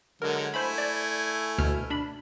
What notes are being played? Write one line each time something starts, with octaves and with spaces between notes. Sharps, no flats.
D3 F#3 G#3 A#4
A3 E4 C5 G#5 B5
D5
D2 B2 F6
D4 B5